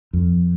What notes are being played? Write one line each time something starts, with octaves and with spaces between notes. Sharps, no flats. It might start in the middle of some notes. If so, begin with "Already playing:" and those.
F2